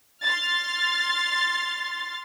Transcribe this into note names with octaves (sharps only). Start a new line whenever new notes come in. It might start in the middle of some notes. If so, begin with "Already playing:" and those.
C6 F6 A6